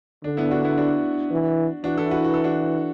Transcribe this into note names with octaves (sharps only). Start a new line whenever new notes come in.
D3 D4
B3 E4
D4 F#4
B3 E4
D4 F#4
E3
E3 D4 F#4
E4 A4
F#4 B4
F#4
A4
D4 F#4